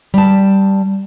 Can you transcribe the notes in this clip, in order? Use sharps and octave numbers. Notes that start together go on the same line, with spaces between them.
G3 A5